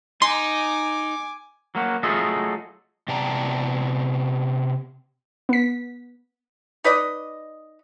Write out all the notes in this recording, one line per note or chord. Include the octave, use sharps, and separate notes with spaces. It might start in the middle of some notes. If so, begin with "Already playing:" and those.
D#4 G#5 C6 D6
F#3 A#3 F#4
F#3 A3 F4 G#4 D#5 E5
C3 B3 D5 G5 A5 A#5
B3 B6
D#4 B4 D5 D#5